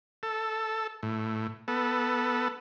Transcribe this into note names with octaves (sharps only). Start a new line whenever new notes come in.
A4
A2
B3 A4